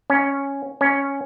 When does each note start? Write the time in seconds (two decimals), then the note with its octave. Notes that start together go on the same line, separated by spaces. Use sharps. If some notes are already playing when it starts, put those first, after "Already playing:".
0.10 C#4
0.81 C#4